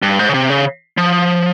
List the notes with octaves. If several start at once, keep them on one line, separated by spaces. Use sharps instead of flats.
G2
G#2
C#3
C3
C#3
F3